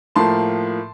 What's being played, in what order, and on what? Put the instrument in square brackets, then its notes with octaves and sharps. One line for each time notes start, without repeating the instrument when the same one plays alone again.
[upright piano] A2 F3 A#3 A5 C6